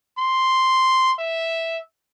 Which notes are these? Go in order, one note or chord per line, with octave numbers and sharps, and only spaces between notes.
C6
E5